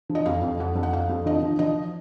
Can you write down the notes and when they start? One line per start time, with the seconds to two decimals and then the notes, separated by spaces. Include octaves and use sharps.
0.09 F3
0.15 D#5
0.26 F2 F5
0.43 F2
0.60 F2 F#5
0.76 F2
0.83 F#5
0.93 F2 F5
1.10 F2
1.26 F3 D#5
1.42 F3
1.59 F3 D#5